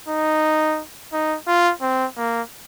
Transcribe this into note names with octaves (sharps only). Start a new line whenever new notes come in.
D#4
D#4
F4
C4
A#3